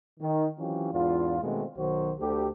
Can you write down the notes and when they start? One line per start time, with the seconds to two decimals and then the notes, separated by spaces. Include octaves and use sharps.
0.20 D#3
0.58 E3 F#3 C4 C#4 F4 G4
0.91 E2 G#2 D4 F4
1.42 B2 D#3 G#3 A3 C4
1.77 B1 D#3 F#3 F#4 C5
2.19 D2 G4 A4